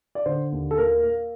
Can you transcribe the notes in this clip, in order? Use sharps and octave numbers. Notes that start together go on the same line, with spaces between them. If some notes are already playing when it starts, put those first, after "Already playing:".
D5
D3 C5
D#2
A4
A#3 A#4
A#3